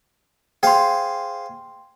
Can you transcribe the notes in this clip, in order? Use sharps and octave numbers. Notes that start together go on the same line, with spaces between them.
G#4 C5 F5 G5 C6